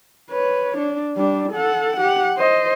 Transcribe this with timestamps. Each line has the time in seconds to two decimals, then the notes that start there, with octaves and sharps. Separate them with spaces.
0.31 B4 C#5
0.77 D4
1.16 G3 D4
1.52 A4 F#5
1.96 G4 F#5
2.38 C5 D#5